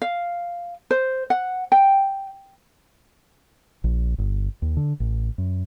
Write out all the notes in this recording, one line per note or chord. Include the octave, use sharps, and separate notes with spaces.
F5
C5
F#5
G5
A#1
G1
D#2
D3
A1
F#2